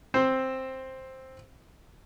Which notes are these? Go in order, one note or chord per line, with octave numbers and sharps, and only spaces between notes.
C4 C5